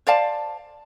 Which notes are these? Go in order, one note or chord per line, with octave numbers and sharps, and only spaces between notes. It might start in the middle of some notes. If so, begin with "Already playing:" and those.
C5 D5 F5 A5